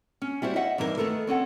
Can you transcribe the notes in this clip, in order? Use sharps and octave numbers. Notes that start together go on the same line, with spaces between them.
C#4
G3 E4 F#4 C5
D#5 E5 F#5
G2 E3 D#4 E4 A#4
D#3 A3 B3 A4 A#4
C4 C#4 A4 F#5